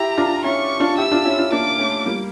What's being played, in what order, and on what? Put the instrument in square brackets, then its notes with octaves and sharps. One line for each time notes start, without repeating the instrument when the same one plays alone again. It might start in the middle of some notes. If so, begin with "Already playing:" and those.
Already playing: [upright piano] E4 G4 [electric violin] A#5
[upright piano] D4 F4
[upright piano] C#4 E4 [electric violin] C#6
[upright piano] D4 F4
[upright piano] E4 G4 [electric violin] E6
[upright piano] D4 F4
C#4 E4
D4 F4
[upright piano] A#3 D4 [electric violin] D6
[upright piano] A3 C#4
G3 A#3